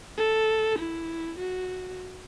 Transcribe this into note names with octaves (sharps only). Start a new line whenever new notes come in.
A4
E4
F#4